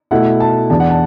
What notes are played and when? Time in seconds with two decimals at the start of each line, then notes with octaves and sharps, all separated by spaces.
0.11 B2 A3 E4 F#5
0.40 A5
0.70 E2 E3 B3 D4 A5
0.80 F#5
0.90 A5